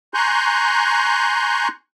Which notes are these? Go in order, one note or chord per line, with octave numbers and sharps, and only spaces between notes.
G#5 A#5 C6 C#6 F#6 G6